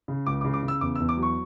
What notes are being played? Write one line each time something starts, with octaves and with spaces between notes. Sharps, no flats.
C#3
C#2 D6
D6
C#3
D6
C#3
E6
E2 D6
E6
E2
D6
F#3
C#6